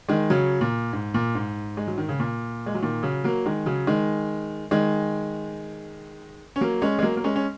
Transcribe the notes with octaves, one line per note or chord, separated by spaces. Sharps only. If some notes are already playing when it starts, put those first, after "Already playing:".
D#3 G#3
C#3 F#3
A#2
G#2
A#2
G#2
G#3
F#3
D#3
C#3
A#2
G#3
F#3
A#2 D#3
C#3 F#3
F#3 A#3
D#3 G#3
C#3 F#3
D#3 G#3
D#3 G#3
C#4
F#3 A#3
G#3 C#4
G#3
F#3 A#3
A#3
G#3 C#4
C#4